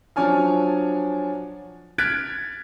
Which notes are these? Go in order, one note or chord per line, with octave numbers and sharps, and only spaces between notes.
F3 F#3 D4 C#5 G#5 F6
F6 F#6 G#6 A6 B6 D7